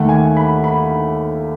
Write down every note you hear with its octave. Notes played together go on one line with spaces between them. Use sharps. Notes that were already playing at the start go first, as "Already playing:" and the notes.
Already playing: D#2 D#3 A3 F#5
G#5
B5
B5